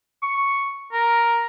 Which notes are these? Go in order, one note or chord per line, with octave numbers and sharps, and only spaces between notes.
C#6
A#4